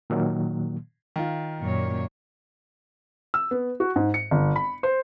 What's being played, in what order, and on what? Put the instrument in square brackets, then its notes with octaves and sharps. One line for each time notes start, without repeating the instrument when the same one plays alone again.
[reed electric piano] A#2 D#3 F#3 A#3
[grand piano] D#3 F4
[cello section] F#2 A#2 C#5
[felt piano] E6
B3
F#4
G#2
C#7
G1
B5
C5